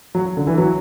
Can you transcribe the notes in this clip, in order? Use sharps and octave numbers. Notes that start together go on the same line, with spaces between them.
F#3
D3
E3
F#3